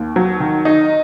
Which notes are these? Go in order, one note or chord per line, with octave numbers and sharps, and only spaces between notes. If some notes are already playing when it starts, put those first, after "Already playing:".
Already playing: D#2
F#3
D#3
D#4